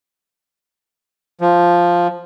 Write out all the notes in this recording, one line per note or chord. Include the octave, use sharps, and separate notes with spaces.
F3